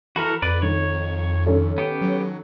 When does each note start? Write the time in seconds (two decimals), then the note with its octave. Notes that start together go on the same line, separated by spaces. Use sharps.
0.16 E3 F#4 A4 A#4 B5
0.42 F2 B4 D5
0.62 D#3 C#5
1.46 D#3 C#4 A4
1.78 B3 G4
2.01 F#3